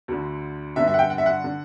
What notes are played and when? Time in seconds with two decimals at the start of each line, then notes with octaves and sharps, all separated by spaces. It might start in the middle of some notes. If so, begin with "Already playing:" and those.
0.08 D2 D3
0.76 G2 D3 E5
0.88 E5
0.94 F#5
0.99 G5
1.10 F#5
1.18 E5
1.26 F#5
1.44 D3